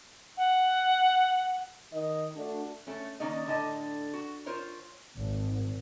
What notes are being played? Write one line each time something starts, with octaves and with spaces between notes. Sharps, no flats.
F#5
D#3 D#5
A3 D4 F#4
A3 C#4
D#3 A#3 C#4 D#4 D5 D#5
A2 D3 D#5 A5
F#4
F4 A#4 C5 C#5
G#1